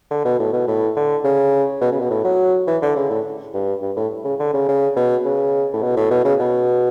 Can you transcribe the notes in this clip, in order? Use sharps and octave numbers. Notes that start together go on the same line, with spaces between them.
D3
B2
A2
B2
A2
D3
C#3
B2
C#3
B2
A2
F#3
E3
D3
C#3
A2
G2
G2
A2
C#3
D3
C#3
C#3
B2
C#3
A2
B2
A2
B2
C#3
B2